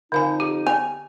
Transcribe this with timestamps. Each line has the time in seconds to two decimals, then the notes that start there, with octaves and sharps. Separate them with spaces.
0.12 F2 D3 D#4 F5 G#5
0.40 G4
0.67 B3 G#5